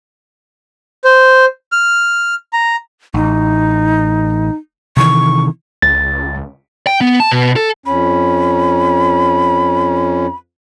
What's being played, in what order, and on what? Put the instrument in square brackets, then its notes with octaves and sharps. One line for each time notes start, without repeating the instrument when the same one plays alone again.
[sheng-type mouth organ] C5
F6
A#5
[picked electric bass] A1 [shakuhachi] D#4
[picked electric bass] C3 D#3 E3 [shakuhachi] C#6
[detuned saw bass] C#2 [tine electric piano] A6
[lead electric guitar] G5
B3
A5
B2
A4
[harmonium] F2 C#4 [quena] B5